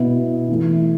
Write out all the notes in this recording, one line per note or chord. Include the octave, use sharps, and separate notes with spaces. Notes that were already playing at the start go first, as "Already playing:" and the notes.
Already playing: B2 B3 E4
E3 A3 E4